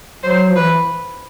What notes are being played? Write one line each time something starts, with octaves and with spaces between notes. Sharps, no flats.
F#3 C5
F3
E3 B4